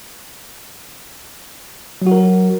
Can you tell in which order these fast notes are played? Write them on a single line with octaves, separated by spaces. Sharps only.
F#3 F#4 A#4